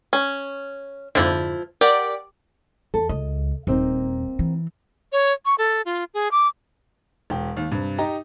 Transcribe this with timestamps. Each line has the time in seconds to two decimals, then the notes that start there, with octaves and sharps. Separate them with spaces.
0.13 C#4
1.15 F2 G#2 D3 F3 E4
1.81 G4 A#4 D5 F#5
2.94 E2 A4
3.09 C#2 D#5
3.67 D#1 A#3 C4 D#4
4.39 E3
5.12 C#5
5.45 C#6
5.58 A4
5.85 F4
6.14 G#4
6.31 D6
7.30 E1 G5
7.57 D#2
7.71 G2 C3
7.98 D#4 G4 A#5